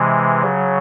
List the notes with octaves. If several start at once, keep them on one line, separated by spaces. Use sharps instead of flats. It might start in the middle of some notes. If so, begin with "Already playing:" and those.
Already playing: C3 E3 G#3
C#3 F#3